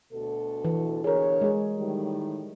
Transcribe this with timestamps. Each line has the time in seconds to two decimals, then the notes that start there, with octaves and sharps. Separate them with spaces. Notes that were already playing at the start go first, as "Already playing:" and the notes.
0.12 D2 B2 A4
0.65 E3
1.04 B2 D3 G#4 A#4 C#5
1.41 G#3 G#4
1.78 A2 D#3 G3